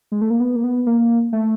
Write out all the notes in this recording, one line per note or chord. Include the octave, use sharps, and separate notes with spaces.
G#3
A3
A#3
B3
A#3
B3
A#3
A3